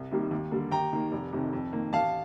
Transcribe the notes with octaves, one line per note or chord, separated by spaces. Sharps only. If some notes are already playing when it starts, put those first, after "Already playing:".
Already playing: C2
C3 D#3 G3 A#3
D#2
D3 G3 A#3
D#2 G5 A#5
D#3 A#3
F1
F2 C3 D#3
F2
D#3 A#3
A1 F5 A5